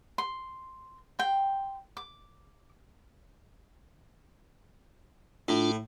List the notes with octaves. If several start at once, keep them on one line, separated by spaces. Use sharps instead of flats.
C6
G5 C6
D6
A2 D4 F4